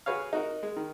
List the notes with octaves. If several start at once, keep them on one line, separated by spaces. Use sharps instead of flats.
F#4 G#4 B4 C#5 F5
D#4 F#4 A#4
G#3
D#3